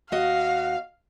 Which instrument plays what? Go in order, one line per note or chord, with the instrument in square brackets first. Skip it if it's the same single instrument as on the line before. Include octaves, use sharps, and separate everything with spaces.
[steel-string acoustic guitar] D#2 F#4 D#5 [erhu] F5